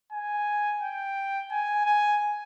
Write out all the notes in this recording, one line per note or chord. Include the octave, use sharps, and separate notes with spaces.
G#5
G5
G#5
G#5